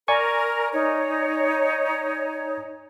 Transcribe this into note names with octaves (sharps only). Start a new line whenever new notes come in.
A#4 D5 G#5 C#6
D#4 C#5